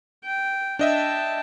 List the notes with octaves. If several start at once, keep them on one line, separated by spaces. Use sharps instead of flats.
G5
D4 D#5 E5 G5 A5